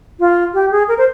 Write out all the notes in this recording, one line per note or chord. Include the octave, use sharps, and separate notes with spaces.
F4
G4
G#4
A#4
C5